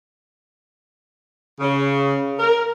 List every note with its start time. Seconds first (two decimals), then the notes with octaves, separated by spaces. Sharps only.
1.60 C#3
2.39 A#4